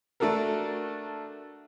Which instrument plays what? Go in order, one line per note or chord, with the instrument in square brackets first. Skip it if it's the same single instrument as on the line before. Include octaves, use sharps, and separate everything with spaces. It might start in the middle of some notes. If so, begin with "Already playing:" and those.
[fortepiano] A3 D4 F#4 A4 A#4